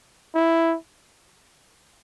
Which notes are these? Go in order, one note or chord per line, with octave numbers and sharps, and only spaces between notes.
E4